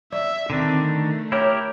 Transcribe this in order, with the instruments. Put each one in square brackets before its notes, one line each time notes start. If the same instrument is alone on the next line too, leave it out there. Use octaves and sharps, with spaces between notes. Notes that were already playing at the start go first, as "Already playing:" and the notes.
[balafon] D5 [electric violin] E5
[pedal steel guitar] D3 D#3 D4 [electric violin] C4
[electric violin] A3
[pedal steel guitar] E4 G4 A#4 [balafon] C#5